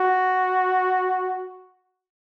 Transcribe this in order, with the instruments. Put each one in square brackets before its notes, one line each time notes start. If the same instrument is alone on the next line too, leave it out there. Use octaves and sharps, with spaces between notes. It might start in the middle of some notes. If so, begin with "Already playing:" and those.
Already playing: [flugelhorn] F#4